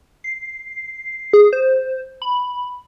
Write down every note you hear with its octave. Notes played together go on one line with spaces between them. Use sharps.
C7
G#4
C5
B5